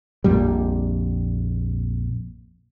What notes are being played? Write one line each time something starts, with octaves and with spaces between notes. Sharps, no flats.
A#1 F2 A#2 G3